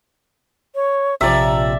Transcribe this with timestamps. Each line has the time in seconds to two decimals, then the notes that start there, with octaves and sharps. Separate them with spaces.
0.75 C#5
1.21 A#1 C3 F3 D5 E5 A#5